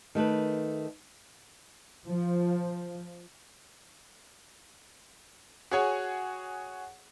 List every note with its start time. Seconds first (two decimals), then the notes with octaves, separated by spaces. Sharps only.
0.15 D#3 A3 A4 B4
2.06 F3
5.71 F#4 G#4 C#5 F#5 G#5